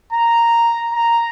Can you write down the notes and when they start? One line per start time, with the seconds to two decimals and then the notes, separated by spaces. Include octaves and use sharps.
0.13 A#5
0.94 A#5